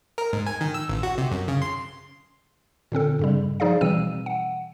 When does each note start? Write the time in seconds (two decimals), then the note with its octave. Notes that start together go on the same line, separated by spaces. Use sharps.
0.18 A#4
0.33 G#2
0.46 G#5
0.61 D#3
0.74 E6
0.89 A1
1.03 F#4
1.18 C3
1.32 F#2
1.48 C#3
1.62 C6
2.92 A#2 D3 C4 A4
3.19 G2 C#3 G3
3.60 F3 D#4 G#4 D5 F5
3.81 B2 E3 G3 C4 E6 D#7
4.26 F#5